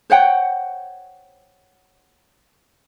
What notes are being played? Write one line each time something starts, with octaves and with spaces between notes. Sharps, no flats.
C5 C#5 F#5 G5